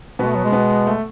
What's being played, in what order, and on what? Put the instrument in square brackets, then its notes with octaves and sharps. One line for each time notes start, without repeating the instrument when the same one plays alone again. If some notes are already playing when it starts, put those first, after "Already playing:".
[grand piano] B2 B3 [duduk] G#3
[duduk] A3
F#3
G#3
[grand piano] B2 B3
A3